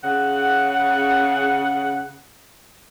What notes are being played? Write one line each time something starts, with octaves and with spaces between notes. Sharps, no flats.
C#3 F#5